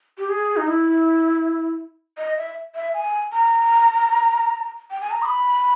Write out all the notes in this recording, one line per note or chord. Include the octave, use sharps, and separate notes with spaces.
G4
G#4
D#4
E4
D#5
E5
E5
G#5
A#5
G5
G#5
A#5
D#6
B5